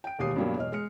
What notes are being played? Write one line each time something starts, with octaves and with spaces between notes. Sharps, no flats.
G5 D7
E1 D#2 G4 D#6 C7
G2 B2 F#3 G3 A#3
E1 C#5 D#5 F6
G#3 F6 C#7